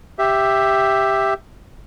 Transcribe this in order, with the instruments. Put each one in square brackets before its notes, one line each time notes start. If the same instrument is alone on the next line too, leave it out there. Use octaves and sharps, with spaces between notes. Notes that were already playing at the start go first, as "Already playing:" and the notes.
[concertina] G4 E5